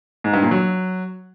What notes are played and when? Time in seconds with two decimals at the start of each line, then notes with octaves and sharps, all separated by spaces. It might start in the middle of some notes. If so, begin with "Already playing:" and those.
0.24 G#2
0.33 G2
0.42 A#2
0.51 F#3